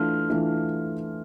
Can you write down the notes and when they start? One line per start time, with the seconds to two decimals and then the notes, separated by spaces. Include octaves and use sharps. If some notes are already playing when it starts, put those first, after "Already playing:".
Already playing: E3 A3 D4 F4 F6
0.30 E3 A3 D4 F4